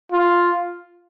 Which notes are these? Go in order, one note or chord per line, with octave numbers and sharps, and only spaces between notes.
F4